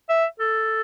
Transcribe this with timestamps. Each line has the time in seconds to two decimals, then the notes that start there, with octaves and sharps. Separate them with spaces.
0.09 E5
0.40 A4